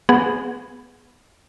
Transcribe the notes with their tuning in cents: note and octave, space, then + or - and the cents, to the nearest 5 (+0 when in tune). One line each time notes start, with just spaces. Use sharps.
B3 +0 G#4 +0 F#5 +0